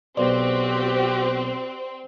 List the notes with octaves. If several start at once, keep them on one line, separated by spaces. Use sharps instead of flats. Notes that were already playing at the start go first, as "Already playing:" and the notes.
B1 C4 F#4 G4 D5